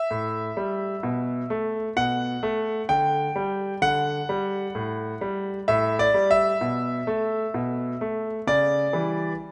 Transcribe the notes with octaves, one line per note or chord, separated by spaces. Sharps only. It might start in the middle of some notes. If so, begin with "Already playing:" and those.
Already playing: E5
A2
G3
B2
A3
B2 F#5
A3
D3 G5
G3
D3 F#5
G3
A2
G3
A2 E5
D5
G3
E5
B2
A3
B2
A3
C#3 D5
E3 G3